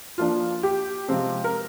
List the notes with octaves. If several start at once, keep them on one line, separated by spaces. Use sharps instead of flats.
F3 A#3 D4 F4
G4
C3 F3 G#3 C4
A#4